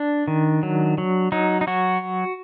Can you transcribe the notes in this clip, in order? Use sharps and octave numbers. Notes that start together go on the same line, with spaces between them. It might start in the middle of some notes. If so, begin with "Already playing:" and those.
Already playing: D4
D#3
F#3
F#3
F#3 D#4
D#4
F#3 F#4